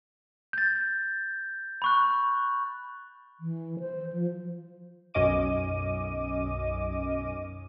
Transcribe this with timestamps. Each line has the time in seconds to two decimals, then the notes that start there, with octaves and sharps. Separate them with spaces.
0.53 G6 A6
1.82 B5 C#6 F#6
3.40 E3
3.80 C5
4.13 F3
5.14 B1 F#2 C#4 D#5 D6 D#7